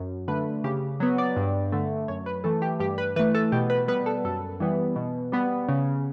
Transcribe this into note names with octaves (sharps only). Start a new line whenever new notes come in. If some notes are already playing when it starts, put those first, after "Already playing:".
Already playing: F#2
D3 A3 B4
C#3 G4
F#3 B3
D5
G2
D3 A3
F#2 C#5
B4
E3 A3 A4
G4
G2 G4
B4
E3 A3 B4
A4
B2 G4
B4
G3 B3 B4
A4
F#2 A4
E3 G3 B3
B2
G3 B3
C#3